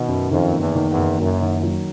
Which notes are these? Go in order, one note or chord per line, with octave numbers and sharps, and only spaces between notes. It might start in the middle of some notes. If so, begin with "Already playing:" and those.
Already playing: B2 D#3
F#2
F2 D#3
F#1
E2
D#3
E2
F#1
F#1 F#2
D#3
F#3